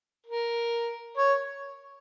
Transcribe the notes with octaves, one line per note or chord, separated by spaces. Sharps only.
A#4
C#5